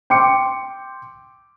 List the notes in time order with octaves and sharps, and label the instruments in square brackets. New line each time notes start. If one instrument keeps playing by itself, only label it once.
[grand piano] G5 C6 D6 C#7